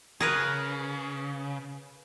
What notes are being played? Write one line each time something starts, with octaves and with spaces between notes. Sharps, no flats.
C#3 G#4 A#4 B4